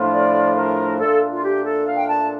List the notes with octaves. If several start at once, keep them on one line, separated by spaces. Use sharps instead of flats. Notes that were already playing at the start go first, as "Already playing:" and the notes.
Already playing: A2 F3 A3 D4 F4
D5
A#4
A#2 A3 D4 F4 A4
F4
G4
A4
F5
G5
A5